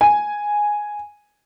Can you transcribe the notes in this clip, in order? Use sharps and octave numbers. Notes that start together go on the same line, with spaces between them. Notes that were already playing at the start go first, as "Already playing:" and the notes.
G#5